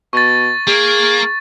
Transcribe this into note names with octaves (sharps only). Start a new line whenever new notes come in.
B2 C#6 A6
A#3 G#4